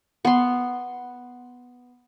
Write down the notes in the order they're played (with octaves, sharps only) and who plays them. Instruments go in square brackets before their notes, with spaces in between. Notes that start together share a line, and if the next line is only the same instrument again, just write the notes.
[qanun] B3 C6